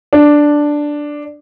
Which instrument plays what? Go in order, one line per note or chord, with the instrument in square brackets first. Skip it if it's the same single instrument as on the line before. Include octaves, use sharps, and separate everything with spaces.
[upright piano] D4